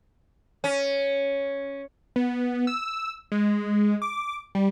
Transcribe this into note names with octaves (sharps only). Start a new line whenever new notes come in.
C#4
B3
E6
G#3
D6
G3